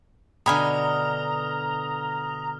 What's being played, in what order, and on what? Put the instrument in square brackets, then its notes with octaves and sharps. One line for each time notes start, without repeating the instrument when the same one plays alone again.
[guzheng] B2 D3 [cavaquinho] D#5 G#5 B5 [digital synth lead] A#5 [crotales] D#6 F6